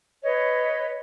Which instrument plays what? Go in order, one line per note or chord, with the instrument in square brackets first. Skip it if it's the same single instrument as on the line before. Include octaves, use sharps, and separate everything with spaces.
[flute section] B4 C#5 D#5